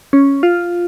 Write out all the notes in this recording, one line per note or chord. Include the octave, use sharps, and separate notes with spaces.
C#4
F4